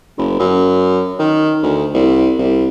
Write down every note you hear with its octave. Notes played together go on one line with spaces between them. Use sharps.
F#1
F#2
D#3
D2
C2
C2